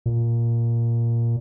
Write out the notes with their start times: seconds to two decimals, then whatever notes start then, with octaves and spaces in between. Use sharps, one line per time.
0.06 A#2